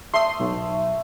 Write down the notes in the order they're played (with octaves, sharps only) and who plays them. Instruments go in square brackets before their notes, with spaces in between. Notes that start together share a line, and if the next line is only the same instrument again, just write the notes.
[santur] A3 D#6 [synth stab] C6
[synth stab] B1